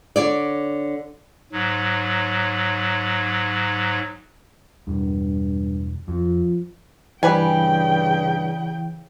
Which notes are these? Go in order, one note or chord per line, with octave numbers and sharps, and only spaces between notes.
D3 C#5 D5
G#2 F#3
E1 G2
F2 F3
G2 C#3 E3 G3 B4 G5 G#5